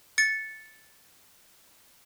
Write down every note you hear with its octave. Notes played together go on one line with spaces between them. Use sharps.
A6 C#7